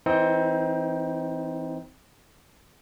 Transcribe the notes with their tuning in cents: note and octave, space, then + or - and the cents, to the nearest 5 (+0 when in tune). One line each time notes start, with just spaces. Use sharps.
E3 +0 C4 +0 D#4 +30